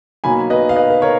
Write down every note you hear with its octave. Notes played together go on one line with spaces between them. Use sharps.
B2 F#3 A#3 D#4 G#5 B5
B4 D#5
F5
B4 D#5
B4
A#4 C#5